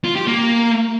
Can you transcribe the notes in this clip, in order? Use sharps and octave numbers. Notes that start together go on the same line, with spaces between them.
F4
G4
A#3